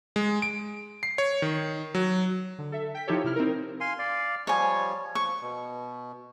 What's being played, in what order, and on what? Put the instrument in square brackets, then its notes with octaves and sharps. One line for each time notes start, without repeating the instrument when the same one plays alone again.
[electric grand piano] G#3
D7
C7
C#5
D#3
F#3
[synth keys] D3
A4 E5
G5 B6
F3 D#4 E4 G4 A4 C#5
C3 E4 F6
C4 D#4 A#4
[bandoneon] F5 G#5 C6
D5 F5
[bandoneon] F3 G3 [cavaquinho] C#5 G#5
[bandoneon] F3 [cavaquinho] C#6
[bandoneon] B2